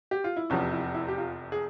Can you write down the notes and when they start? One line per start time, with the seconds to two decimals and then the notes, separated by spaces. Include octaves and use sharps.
0.11 G4
0.24 F4
0.37 E4
0.50 F1 E2 C3 F3 C#4
0.72 E4
0.95 E4
1.08 G4
1.18 F4
1.52 G#4